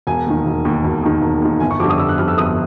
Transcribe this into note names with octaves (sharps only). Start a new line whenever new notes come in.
E1 G#5
D#2 D#3
E1
D#2 D#3
E1
D#2 D#3
E1
D#2 D#3
G1 G#5
C#6
F2 D3 G3 D6
D#6
G1 E6
F#6
F2 D3 G3 F6
E6
G1 D#6